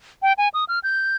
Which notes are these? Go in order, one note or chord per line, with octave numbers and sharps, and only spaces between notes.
G5
G#5
D#6
F6
G6